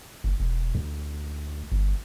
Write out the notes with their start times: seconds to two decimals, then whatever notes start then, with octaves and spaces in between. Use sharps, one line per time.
0.24 F#1
0.40 E1
0.75 D2
1.72 G1